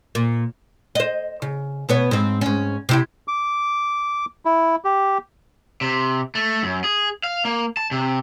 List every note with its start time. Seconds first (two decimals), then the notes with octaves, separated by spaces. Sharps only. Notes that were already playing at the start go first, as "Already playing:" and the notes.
0.15 A#2
0.95 C5 D#5
1.42 C#3
1.89 B2 B3 C#5
2.11 G#2 C4
2.41 G#2 C#4
2.89 C3 E4 G4
3.28 D6
4.45 E4
4.84 G4
5.81 C3
6.35 A3
6.63 F#2
6.84 G#4
7.24 F5
7.45 A#3
7.77 A5
7.91 C3